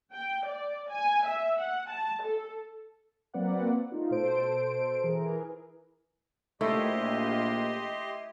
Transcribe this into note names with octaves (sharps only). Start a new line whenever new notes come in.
G5
D5
G#5
E5
F#5
A5
A4
F#3 A#3 C4 B4 D5 F#5
A3 D#4 F4
B2 A4 C5 D7
E3 G#4 A#4
A#1 A3 E4 G4 D#5 C6